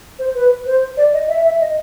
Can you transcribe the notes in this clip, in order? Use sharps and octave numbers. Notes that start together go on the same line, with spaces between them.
C5
B4
C5
D5
D#5
E5
E5
D#5